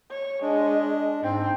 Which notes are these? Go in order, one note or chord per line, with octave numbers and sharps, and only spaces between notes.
C#5
G#3 D4
G#2 C4